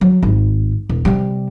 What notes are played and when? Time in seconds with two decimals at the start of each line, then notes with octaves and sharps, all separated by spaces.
0.01 F#3
0.23 G#1
0.89 E1
1.05 C3 G3